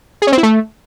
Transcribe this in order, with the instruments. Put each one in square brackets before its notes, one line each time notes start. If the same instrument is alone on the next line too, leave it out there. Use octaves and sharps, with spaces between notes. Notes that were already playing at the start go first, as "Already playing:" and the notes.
[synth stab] G#4
C#4
C4
E4
A3